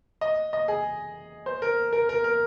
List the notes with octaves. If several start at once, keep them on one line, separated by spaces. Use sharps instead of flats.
D#5
D#5
G#4
C5
A#4
A#4
A#4
A#4